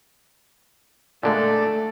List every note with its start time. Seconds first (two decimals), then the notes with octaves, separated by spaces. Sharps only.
1.23 A#2 D3 G#3 A3 A4 D5